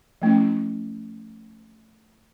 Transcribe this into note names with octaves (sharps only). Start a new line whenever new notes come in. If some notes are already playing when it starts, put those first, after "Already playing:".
F3 A3 C#4 E4